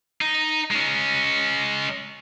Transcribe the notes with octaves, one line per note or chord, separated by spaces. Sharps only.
D#4
G#3 C#4